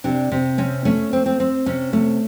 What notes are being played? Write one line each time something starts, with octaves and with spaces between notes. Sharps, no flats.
C3 D4
C3
C4 C#4
A3 C#4
C4
C4
C4
C3 C#4
A3